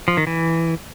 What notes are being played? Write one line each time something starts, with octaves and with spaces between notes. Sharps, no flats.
F3
D#3
E3